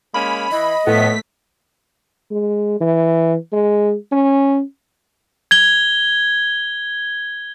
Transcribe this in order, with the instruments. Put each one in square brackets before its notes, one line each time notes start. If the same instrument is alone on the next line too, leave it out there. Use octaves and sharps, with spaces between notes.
[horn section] G#3 A#3 C#4 [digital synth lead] B5
[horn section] E3 [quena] D#5
[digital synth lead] A2 [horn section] F3 B3 [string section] A3 B6
[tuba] G#3
E3
G#3
C#4
[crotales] G#6 G7